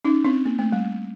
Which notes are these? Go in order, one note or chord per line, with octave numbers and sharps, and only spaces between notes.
C#4 D#4
C4 D4
A#3
A3
G3